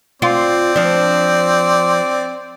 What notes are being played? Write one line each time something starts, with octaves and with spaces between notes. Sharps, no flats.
C4 F4 D5
F3 D4